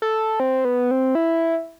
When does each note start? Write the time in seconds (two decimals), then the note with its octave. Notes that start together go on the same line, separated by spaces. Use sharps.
0.02 A4
0.40 C4
0.65 B3
0.91 C4
1.15 E4